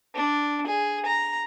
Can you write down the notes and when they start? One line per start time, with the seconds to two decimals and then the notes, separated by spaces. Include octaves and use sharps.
0.15 D4
0.67 G#4
1.05 A#5